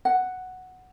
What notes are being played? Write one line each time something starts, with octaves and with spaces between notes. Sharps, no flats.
F#5